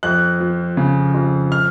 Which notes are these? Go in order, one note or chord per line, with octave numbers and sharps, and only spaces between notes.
F2 F#6
F3
C#3
F2
F6